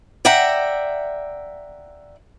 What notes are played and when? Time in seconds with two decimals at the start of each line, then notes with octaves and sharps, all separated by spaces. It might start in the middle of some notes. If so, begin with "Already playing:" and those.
0.25 D5 E5 F#5 G5 A#5